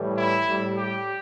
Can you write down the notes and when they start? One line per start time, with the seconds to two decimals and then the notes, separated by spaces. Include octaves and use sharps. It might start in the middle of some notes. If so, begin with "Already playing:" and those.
Already playing: A2 E3 G3
0.18 E4
0.47 A2 G3
0.77 G4